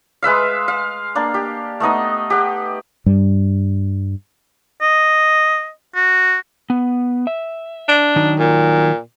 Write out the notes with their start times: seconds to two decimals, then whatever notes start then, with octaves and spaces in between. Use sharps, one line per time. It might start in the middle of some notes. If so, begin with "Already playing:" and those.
0.23 G#3 B4 E5 F5
0.68 F5
1.15 A#3 D4
1.34 G4
1.80 A3 B3 D#4 D#5
2.30 G4 F#5
3.06 G2 G3
4.82 D#5
5.95 F#4
6.70 B3
7.27 E5
7.89 D4
8.16 D#3 F#3 D#4
8.39 A#2